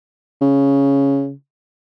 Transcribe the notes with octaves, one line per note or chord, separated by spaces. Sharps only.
C#3